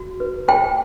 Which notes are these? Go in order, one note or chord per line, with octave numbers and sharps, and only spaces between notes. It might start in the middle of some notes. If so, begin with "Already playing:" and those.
Already playing: F#4
B4
C5 G5